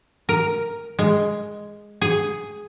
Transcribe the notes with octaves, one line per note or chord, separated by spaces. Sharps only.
A#4
G#3
G#4